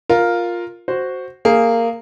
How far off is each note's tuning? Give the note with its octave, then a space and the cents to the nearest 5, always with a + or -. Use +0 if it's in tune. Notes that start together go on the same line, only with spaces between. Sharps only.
F4 +5 A#4 +0
F#4 +0 C5 +0
A#3 -15 G#4 +0